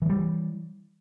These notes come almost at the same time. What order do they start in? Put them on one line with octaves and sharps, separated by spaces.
E3 G#3 G3